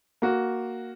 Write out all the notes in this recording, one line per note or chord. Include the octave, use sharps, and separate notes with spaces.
A#3 F#4